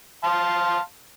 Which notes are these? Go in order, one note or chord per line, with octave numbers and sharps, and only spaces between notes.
F5 A5 C6